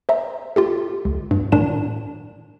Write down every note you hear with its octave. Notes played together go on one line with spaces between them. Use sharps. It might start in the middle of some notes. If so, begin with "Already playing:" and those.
C5 E5 A#5
F4 G4 A4
C#2
G2
A2 D#3 D4 D5 G#5 E7